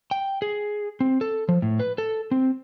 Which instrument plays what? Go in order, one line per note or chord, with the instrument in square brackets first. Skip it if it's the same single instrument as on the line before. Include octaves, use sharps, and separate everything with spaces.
[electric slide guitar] G5
G#4
C4
A4
F3
A2
B4
A4
C4